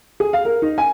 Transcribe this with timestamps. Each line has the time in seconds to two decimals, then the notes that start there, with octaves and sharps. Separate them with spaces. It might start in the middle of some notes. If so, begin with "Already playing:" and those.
0.20 G#4
0.33 F5
0.45 A#4
0.62 D#4
0.78 G#5